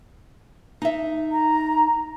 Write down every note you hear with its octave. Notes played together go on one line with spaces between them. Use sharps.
D#4 E5
A#5